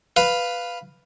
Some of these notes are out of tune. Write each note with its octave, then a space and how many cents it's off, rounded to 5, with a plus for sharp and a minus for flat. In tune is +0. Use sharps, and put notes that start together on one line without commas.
B4 +0 F5 +0